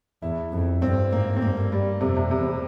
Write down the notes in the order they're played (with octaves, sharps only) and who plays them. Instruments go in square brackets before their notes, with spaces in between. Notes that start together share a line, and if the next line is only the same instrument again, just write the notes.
[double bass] E2 [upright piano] E4
[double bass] F2
[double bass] G2 [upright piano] C4
[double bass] G#2 [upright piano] A#3
[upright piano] C4
[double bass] G2 [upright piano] A#3
[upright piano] G3
[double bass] F2 [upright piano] C3
[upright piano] C3
[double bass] E2 [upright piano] C3